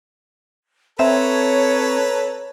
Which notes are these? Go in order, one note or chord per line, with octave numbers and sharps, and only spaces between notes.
C4 A4 B4 C#5 E5 A#5